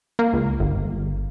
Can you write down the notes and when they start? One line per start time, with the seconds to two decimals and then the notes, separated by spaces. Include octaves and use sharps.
0.19 A#3
0.33 C#2
0.60 G1